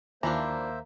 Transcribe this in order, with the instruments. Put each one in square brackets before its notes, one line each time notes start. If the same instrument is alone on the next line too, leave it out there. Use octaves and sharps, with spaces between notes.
[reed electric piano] D#2 A#5 [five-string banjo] E3 F3 D4 [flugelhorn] A#3 [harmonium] C5 E5